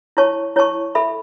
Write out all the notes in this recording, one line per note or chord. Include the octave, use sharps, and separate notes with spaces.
E4 C#5 A5 C#6
E4 C#5 A5 C#6
A4 E5 B5